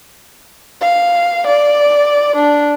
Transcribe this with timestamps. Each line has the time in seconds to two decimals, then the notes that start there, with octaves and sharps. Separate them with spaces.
0.81 F5
1.47 D5
2.36 D4